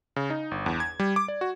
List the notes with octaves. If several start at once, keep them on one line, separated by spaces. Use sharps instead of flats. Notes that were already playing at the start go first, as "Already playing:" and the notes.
C#3
D#4
G1
E2
G#6
G3
D6
D5
F#4